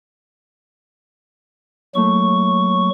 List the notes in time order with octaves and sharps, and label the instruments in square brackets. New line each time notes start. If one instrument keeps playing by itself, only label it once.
[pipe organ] F#3 C#6 [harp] A3 A#3 E4